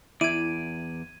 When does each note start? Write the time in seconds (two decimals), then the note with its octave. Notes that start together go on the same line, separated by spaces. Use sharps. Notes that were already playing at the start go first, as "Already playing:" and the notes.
0.21 E2 E4 D5 G#6 D#7